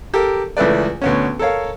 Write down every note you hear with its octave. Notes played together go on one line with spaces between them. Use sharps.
G4 A4 A#4
C#2 E3 A3 B4 D5
D2 B3 C#4
A4 A#4 C#5 F5